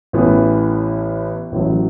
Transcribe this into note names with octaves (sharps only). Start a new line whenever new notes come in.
A1 A2 E3 B3
A1 A2 F#3